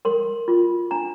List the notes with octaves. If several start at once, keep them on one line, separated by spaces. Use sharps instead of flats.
A#4 C6
F4
D4 A#5